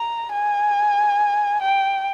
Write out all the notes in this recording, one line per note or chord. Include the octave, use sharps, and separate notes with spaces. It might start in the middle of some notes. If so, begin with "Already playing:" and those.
Already playing: A#5
G#5
G5